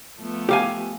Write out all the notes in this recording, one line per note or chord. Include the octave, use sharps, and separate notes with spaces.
F3 A3 B3
G4 F5 G#5